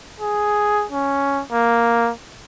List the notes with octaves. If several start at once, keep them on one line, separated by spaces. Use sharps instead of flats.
G#4
C#4
A#3